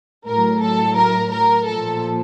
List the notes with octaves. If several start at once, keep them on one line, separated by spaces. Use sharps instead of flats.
A2 F#3 A#4
A4
A#4
A#4
A#2 F3 A4